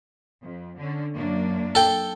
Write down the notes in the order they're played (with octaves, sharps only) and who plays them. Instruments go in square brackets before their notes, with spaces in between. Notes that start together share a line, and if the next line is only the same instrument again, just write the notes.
[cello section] F2
D3 C#4
F#2 A#3 D4
[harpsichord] A4 G5